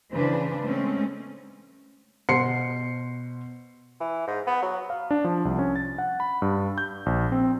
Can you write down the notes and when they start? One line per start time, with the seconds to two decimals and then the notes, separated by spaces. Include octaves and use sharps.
0.12 C#3 E3 D4 B4 C5
0.63 G#3 A3 C4 C#4
2.29 B2 C5 F#5 C6 C7 C#7
4.00 E3
4.27 G#2
4.47 B3
4.62 F#3
4.90 F5
5.11 D4
5.24 F3
5.45 C2
5.59 C#4
5.76 A6
5.98 F#5
6.20 B5
6.42 G2
6.78 G6
7.06 A#1
7.32 C4